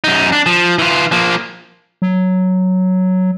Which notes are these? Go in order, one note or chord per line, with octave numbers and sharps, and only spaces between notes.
F#2 D#4
D4
F3
E3 F4
F3 A#3
F#3